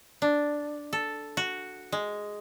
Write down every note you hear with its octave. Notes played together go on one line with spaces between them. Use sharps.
D4
A4
F#4
G#3